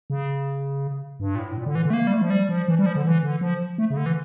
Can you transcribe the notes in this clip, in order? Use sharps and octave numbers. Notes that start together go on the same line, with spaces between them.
C#3
G2
A#2
A2
A#2
D3
E3
D3
A3
A#3
G3
A3
F3
G3
F3
E3
G3
F3
D3
E3
D3
F3
A3
C#3
D3
E3